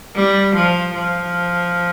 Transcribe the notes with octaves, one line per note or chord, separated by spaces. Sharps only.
G3
F3
F3